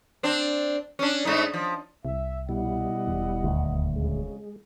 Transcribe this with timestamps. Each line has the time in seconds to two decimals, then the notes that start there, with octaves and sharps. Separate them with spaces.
0.23 C4 D4
0.99 C#4 D4
1.25 G#2 A3 D#4
1.54 F3
2.05 C2 E5
2.49 B2 G3 E4 D5 D#5 F#5
3.07 E1
3.44 D#1 D2
3.96 B1 F2 C#3 G#3